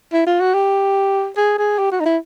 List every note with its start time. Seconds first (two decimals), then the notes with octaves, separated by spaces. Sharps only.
0.13 E4
0.27 F4
0.40 F#4
0.54 G4
1.37 G#4
1.58 G#4
1.78 G4
1.92 F#4
2.00 D#4
2.05 E4